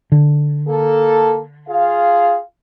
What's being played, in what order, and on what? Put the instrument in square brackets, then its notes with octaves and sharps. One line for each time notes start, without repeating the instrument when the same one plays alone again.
[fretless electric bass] D3
[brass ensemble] A#3 A4
F4 G#4 F5